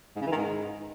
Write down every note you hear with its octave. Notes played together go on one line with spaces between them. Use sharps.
G#2
C#3
E3
D#3
G#2